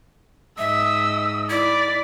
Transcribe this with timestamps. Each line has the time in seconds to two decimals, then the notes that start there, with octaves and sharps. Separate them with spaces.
0.58 G#2 D#5 E5 E6
1.50 E4 D5 B5